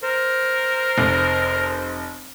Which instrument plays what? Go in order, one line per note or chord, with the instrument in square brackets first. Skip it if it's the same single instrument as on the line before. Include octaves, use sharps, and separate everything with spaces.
[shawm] A#4 [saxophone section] C5
[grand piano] F1